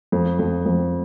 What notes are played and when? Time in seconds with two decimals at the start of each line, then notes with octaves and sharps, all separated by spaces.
0.12 F2
0.39 F2
0.66 F2